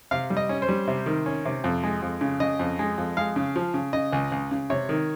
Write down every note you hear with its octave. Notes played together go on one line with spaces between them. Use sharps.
C3 F5
G3
D#5
C#4
C5
G3
C3
D#3
C#4
C3
F2
G#3
F2
C#3
C#3 D#5
F2
G#3
F2
G#3 F5
C#3
F3
C#3
C#3 D#5
C#2
C#2
C#3
C3 C#5
D#3